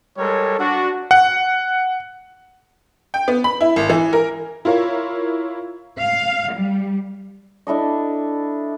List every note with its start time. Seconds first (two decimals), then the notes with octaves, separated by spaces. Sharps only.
0.18 G3 G#3 A4 A#4 C#5
0.59 D4 F#4
1.11 F#5
3.14 G5
3.28 B3
3.44 B5
3.61 E4
3.76 G#1
3.90 E3
4.13 A#4
4.65 E4 F4 A#4 C#5 F5
6.00 F5
6.54 G3
7.67 D4 E4 A4 D#5